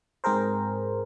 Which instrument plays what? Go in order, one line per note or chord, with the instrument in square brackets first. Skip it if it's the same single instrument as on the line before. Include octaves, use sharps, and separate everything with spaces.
[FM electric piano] G#2 C4 G#4 A#4 C5